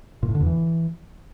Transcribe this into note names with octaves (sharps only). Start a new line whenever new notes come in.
A#2
A2
D3
E2
E3